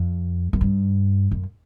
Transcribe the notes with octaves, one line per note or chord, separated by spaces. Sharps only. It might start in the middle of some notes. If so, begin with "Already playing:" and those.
Already playing: F2
F#2
G2
F#2